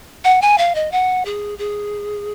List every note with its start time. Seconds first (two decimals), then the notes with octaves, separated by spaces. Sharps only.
0.24 F#5
0.42 G#5
0.58 F5
0.75 D#5
0.92 F#5
1.25 G#4
1.59 G#4